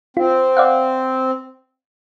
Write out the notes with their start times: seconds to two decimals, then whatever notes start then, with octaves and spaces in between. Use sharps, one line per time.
0.17 C4 F4
0.57 D5 F5 F#5